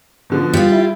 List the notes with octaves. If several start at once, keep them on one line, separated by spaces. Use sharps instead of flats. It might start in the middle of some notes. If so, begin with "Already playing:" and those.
B2 D3 F3
G3 F4
E4